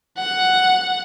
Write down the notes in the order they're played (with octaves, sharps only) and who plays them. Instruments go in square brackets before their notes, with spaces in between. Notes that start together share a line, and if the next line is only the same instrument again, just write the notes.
[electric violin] F#5